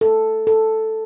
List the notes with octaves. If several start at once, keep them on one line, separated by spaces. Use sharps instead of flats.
A4
A4